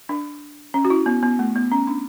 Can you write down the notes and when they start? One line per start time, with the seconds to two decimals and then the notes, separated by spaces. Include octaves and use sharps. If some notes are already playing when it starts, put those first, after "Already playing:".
0.09 D4
0.74 C#4
0.85 F#4
0.90 E4
1.06 B3
1.23 B3
1.39 A3
1.55 B3
1.72 C#4
1.87 D4